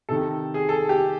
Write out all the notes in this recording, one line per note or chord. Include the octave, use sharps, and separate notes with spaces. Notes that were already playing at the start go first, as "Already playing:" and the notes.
C3 D#3 A4
G#4
A4
G4